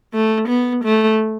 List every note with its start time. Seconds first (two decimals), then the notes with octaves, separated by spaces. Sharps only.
0.14 A3
0.48 B3
0.84 A3